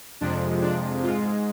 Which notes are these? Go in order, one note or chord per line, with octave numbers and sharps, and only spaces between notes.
F2 C3 F3 G#3 D4
D4
G#2 G#3 F4